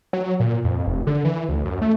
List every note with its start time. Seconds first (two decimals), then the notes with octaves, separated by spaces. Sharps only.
0.13 F#3
0.40 A#2
0.64 F2
0.87 F1
1.07 D3
1.25 E3
1.49 D2
1.65 F#2
1.81 A3